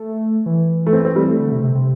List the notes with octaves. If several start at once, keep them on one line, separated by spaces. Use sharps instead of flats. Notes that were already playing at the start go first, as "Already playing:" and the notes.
Already playing: A3
E3
A3
C4
C4
G3
A3
D3
C3
C3
C3